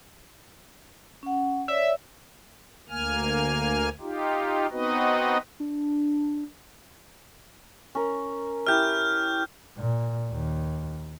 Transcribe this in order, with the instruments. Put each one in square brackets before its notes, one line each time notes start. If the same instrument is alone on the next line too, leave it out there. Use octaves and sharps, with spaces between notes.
[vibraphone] C#4 F#5
[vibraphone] C#5 D5 [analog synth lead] E5
[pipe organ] D2 A#3 G#5 F6
D#4 F4 G4
B3 C4 D#4 F#4 B4 D#5
[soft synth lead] D4
[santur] C#4 A#4
[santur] E4 G4 E5 [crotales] F6 G6
[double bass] A#2
D#2